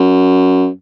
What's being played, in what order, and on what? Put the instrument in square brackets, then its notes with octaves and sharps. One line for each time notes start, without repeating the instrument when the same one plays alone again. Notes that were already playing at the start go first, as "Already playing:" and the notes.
Already playing: [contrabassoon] F#2